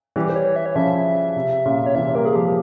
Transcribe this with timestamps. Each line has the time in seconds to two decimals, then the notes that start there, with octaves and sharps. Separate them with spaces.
0.16 E3 G3 G4
0.30 C5
0.36 C#5
0.56 E5
0.66 C#5
0.75 C#3 F3 E5
1.36 C3
1.65 A#2 C#3
1.86 C#5
1.95 C3 E3 E5
2.15 G3 A#3 A#4
2.25 G#4
2.35 F3 G#3 G4